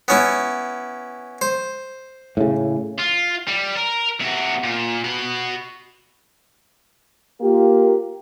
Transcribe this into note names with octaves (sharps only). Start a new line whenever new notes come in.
B3 C#4 E4
C5
A2 C#3
F4
G3
A#4
C3 F#4
A#2
F#4 B5
A#3 F4 G4